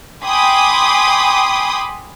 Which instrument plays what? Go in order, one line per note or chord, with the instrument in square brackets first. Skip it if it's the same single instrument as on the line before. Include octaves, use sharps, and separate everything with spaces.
[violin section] G5 G#5 B5 C6 D6 D#6